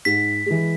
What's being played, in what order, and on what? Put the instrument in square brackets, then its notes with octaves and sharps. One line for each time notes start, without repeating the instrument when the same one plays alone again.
[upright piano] G#2 [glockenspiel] B6
[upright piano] E3 G#3